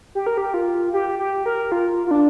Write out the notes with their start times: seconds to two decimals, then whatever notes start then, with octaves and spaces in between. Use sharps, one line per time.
0.15 G4
0.26 A#4
0.38 G4
0.54 F4
0.93 G4
1.19 G4
1.46 A#4
1.72 F4
2.07 F4
2.11 D4